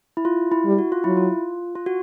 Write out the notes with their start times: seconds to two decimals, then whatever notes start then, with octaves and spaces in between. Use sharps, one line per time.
0.17 E4
0.25 F4
0.52 E4
0.65 G3
0.78 F#4
0.92 F4
1.04 F#3 E4
1.17 F4
1.75 F4
1.86 F#4